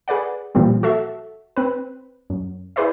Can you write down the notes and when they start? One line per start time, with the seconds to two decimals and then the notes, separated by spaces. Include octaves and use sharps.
0.08 G#4 B4 D5 F#5
0.55 A#2 E3 F3 G3 A#3 C4
0.83 F#4 A4 E5
1.56 C4 B4
2.30 F#2
2.76 E4 G#4 B4 C5 D5 E5